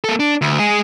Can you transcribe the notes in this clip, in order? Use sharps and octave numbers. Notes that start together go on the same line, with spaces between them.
A#3 A4
D4
D2
G#3 G#4